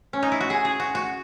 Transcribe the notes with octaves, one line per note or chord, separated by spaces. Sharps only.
C#4
D#4
E4
F#4
G#4
G#4
F#4
F#4